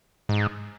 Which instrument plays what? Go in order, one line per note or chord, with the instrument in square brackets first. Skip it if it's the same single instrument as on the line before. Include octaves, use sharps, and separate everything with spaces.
[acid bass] G#2